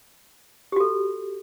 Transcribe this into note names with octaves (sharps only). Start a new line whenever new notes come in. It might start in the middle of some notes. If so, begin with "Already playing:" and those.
F#4 G4 A4